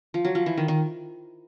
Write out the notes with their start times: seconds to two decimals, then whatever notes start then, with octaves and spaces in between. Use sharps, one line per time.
0.14 F3
0.25 F#3
0.35 F3
0.46 E3
0.57 D#3
0.68 D#3